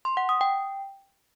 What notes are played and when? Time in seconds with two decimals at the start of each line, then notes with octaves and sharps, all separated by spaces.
0.05 C6
0.17 F#5
0.29 D#6
0.41 G5